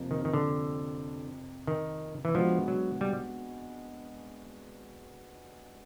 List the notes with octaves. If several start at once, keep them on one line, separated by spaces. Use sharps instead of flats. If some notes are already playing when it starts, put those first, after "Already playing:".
Already playing: F2 C3 F3 A#3
D#3
D#3
D3
D#3
E3
F3 G#3 B3 D4 F#4
F#3
G3